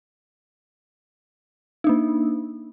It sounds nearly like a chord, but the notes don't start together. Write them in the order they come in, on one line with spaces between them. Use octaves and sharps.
D#4 D4 A#3